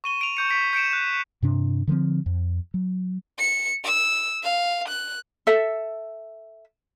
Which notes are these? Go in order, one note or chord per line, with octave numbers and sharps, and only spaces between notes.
C#6 D#7 G7
D7 F7
C#6 G6 C#7
C#6 B6 D7
G6 C#7 D7 E7
F#6
G2 C3 D4
D3 F3 G#3 C4
F2
F#3
C#7
E6
F5
F#6
A4 E5